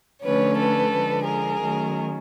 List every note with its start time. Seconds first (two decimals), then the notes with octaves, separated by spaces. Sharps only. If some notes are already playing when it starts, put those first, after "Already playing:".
0.23 D3 F3 A3 C#4 B4 C#5
0.58 A4 B4
0.92 D3 F3 G#3
1.26 G#4 A#4
1.61 D#3 F#3 A3 C#4